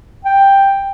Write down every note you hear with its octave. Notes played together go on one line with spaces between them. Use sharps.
G5